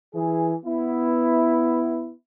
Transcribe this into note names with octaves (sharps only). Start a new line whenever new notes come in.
E3 G#4
B3 E4